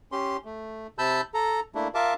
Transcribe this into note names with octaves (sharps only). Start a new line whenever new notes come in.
C#4 G4 C6
A3
C3 A5 B5 E6 G6
A4 A#5
A3 A#3 D4 E4
F4 A#4 E5 F5 A5 D6